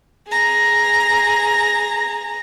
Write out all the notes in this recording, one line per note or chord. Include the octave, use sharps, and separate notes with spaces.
G#4 A#5